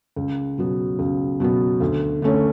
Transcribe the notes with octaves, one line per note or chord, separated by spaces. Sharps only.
C#2
B2 F#3 B3
C#2
B2 F#3 B3
D2
D3 A3 C#4